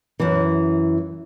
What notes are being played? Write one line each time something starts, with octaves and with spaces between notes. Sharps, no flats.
F#2 E3